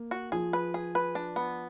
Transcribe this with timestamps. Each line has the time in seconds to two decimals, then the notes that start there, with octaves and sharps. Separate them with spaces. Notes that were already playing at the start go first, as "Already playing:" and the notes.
Already playing: A#3
0.11 F#4
0.32 F3 G#4
0.53 B4
0.74 G#4
0.95 B4
1.15 D4
1.36 B3